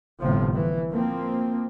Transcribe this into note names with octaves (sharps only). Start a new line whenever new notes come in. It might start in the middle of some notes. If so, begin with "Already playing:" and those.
G1 A2 C3 F3
E3
F3 A#3 C4